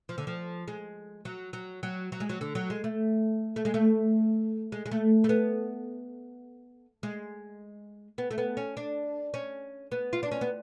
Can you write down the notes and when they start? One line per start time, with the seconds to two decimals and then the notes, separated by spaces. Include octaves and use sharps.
0.09 F3
0.18 D3
0.27 F3
0.68 G#3
1.25 F#3
1.53 F#3
1.83 F#3
2.12 F#3
2.20 G#3
2.29 F#3
2.41 D3
2.55 F#3
2.70 G#3
2.84 A3
3.56 A3
3.65 G#3
3.74 A3
4.72 G#3
4.86 G#3
4.91 A3
5.24 A3
5.29 B3
7.03 G#3
8.18 B3
8.31 A3
8.38 B3
8.57 C#4
8.77 D4
9.34 C#4
9.92 B3
10.13 F4
10.23 D4
10.31 C#4
10.41 B3